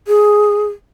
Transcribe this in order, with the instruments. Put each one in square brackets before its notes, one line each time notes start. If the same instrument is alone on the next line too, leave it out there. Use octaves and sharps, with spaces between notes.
[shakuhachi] G#4